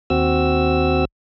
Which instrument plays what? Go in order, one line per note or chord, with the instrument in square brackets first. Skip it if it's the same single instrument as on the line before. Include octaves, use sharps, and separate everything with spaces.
[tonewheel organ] D#2 C4 F#4 E6